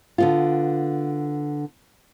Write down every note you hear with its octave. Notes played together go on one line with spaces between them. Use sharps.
D3 B3 F4